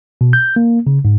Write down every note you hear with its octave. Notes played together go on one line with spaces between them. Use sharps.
B2
G6
A#3
C#3
G#2